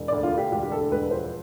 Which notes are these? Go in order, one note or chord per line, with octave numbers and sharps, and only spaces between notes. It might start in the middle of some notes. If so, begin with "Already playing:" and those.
Already playing: E1
D2 D5
F4
D2
G4
E1 G4
G4
D2 A4
E1 B4
F3 C5